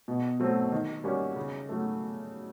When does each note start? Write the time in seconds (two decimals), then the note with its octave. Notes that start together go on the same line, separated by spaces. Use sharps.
0.08 B2
0.40 F#3 A3 C4
0.72 D#3
1.04 G3 A#3 C#4 F#4
1.36 C#3
1.69 F#3 A3